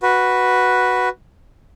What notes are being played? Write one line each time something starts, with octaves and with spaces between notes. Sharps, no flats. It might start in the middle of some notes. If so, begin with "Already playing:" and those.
F#4 B4